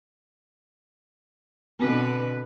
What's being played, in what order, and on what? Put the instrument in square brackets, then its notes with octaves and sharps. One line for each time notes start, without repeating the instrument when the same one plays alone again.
[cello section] B2 D3 B4 [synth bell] B3 C4 F#4